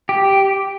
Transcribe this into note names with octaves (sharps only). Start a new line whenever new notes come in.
G4